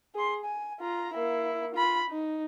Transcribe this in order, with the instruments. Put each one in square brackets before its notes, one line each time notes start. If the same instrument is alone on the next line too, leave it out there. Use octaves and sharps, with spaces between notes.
[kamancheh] G#4 C6
G#5
F4 A#5
A#3 E4
F4 B5
D#4